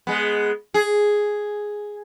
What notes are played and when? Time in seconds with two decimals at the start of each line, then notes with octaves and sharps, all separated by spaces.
0.07 G#3 B3
0.74 G#4